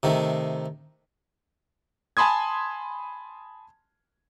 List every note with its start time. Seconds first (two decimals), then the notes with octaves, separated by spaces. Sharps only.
0.03 C3 D#3 A3
2.17 G#5 A5 B5 C6 D#6 G#6